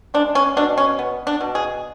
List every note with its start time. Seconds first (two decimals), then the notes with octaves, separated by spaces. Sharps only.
0.14 G#3 D4
0.35 C#4
0.57 B2 D4
0.78 C#4
0.99 B3
1.27 D4
1.41 B2
1.55 G#4